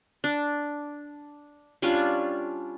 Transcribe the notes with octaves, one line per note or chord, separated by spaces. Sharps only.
D4
G3 C#4 D4 F4